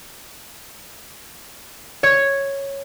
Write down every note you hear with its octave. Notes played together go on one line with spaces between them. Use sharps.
C#5